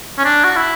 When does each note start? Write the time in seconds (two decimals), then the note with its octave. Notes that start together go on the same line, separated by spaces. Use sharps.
0.18 C#4
0.25 D4
0.44 F#4
0.56 E4